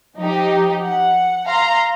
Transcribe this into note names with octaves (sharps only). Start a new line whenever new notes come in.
F3 D#4 G4
F#5
F5 A#5 C6